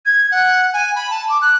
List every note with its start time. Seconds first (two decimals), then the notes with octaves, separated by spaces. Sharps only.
0.05 G#6
0.31 F#5
0.73 G#5
0.95 B5
1.10 A5
1.29 D6
1.41 F#6